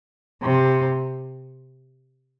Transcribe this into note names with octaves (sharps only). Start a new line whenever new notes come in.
C3